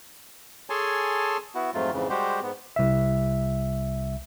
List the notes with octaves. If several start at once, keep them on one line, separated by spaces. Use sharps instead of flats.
G#4 A4 C#5 G#5 A5 C6
B3 E4 F#4
F2 G#2 F#3 A3 F4
F2 G#2 C#3 E3
G3 G#3 F#4 G4 C5
G#2 B3
C2 E5